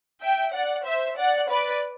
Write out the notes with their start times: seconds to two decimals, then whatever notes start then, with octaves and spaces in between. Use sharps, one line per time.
0.22 E5 G5
0.53 D5 F#5
0.85 C5 E5
1.17 D5 F#5
1.49 B4 D5